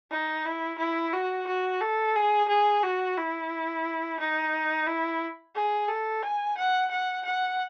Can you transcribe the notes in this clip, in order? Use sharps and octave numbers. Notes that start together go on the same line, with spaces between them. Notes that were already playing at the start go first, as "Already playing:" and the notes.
D#4
E4
E4
F#4
F#4
A4
G#4
G#4
F#4
E4
D#4
E4
G#4
A4
G#5
F#5
F#5
F#5